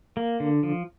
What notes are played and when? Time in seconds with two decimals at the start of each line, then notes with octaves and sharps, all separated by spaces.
0.17 A#3
0.40 D3
0.63 F3